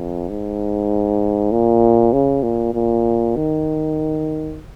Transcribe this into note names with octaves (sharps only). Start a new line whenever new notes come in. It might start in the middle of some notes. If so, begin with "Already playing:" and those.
Already playing: F2
G#2
A#2
C#3
A#2
A#2
D#3